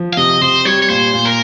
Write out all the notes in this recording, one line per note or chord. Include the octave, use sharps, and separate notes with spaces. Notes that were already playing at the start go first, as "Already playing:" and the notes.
Already playing: F3
F5
C3 D#5
C3 C5
G3 C#5
C#5
A#2 C5
A#2
A#4